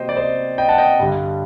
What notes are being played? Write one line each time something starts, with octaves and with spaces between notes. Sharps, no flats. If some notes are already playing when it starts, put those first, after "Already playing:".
Already playing: C3 F#3 A#3 C5 D#5 G5
D5
C5 D#5
D#5 G5
F#5 A5
D#5 G5
G2 D3 G3 D4